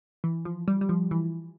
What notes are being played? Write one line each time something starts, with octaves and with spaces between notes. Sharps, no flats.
E3
F3
G3
G3
F3
E3